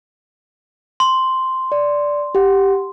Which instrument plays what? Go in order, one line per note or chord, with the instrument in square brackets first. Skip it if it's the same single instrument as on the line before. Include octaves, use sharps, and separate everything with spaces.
[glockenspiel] C6
[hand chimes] D5
G4 F#5